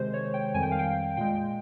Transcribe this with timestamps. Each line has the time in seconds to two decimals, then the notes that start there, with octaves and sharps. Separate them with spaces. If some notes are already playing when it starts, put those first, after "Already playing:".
Already playing: C3 D#3 G#3 C5
0.14 C#5
0.34 G5
0.54 F2 D#3 G3 G#5
0.63 G5
0.72 F5
0.79 G5
1.17 A#2 G#3 G5